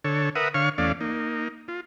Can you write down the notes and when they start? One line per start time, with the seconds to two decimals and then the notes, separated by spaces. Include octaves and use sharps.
0.04 D3 A4 C#5
0.35 A#4 B4 E5 F#5 D#6
0.54 D3 C#5 F5 C#6 F6
0.78 E2 A3 C#4 D5 F5
1.01 A#3 D#4
1.68 F4